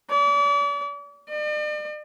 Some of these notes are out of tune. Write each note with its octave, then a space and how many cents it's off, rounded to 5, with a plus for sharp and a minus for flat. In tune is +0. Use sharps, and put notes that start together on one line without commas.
D5 -40
D5 +45